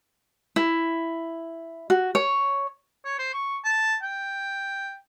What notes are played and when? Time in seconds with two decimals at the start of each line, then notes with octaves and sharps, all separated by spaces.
0.56 E4
1.90 F#4
2.15 C#5
3.05 C#5
3.19 C5
3.34 C#6
3.65 A5
4.03 G5